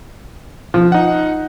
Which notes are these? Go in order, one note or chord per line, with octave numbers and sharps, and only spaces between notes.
F3
D#4 F#5